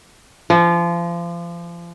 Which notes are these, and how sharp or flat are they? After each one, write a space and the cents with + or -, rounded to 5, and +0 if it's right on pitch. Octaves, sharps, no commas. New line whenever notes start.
F3 -30